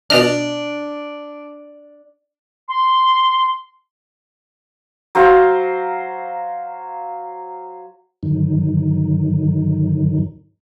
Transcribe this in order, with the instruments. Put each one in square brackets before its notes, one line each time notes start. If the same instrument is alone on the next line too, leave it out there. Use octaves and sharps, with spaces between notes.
[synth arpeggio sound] B2 D#5 F6 [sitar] D4
[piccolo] C6
[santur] F#3 C5 F5 A#5
[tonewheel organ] G2 D3 D#3 F#3 D#4